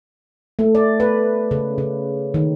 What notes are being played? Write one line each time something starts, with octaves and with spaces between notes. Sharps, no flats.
A3
D5
B4
C#3
C#3
D#3